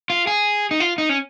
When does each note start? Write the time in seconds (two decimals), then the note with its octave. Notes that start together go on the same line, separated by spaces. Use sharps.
0.10 F4
0.27 G#4
0.71 D#4
0.80 F4
0.98 D#4
1.09 C#4